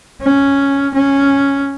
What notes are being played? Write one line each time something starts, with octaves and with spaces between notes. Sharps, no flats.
C#4
C#4